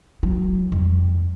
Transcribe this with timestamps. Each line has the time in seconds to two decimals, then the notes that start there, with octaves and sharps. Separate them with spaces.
0.23 F#3
0.72 F2